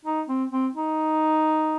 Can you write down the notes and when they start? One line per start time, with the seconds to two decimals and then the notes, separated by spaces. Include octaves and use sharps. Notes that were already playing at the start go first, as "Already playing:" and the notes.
0.05 D#4
0.29 C4
0.51 C4
0.74 D#4